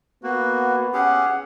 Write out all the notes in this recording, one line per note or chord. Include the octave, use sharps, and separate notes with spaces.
A#3 B3 F#4
C#4 G4 G#4 F#5